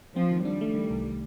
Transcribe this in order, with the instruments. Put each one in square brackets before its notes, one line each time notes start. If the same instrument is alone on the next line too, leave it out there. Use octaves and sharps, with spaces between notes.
[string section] F3 [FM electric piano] C4
[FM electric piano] D#3
[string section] G3 [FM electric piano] D4
[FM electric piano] A3
D#3
C2